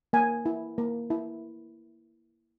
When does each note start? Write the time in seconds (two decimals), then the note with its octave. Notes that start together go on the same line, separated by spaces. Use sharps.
0.13 A#3 G#5
0.46 E4
0.78 A#3
1.10 E4